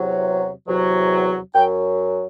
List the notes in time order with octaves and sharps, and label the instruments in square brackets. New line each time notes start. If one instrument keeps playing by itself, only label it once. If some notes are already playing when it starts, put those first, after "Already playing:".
Already playing: [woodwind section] E2 C3 F#3
E2 C3 F#3
F#2 F#3 G5